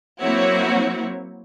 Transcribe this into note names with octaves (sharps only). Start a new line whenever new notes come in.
F#3 A#3 C4 E4 F#4 C#5